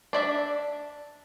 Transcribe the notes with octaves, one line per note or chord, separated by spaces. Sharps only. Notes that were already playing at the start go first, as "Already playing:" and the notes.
D4 D5 E5